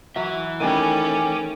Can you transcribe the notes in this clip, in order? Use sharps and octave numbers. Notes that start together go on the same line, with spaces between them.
E3 F#3 E5
D#3 G3 A3 C#4 G5 G#5 D6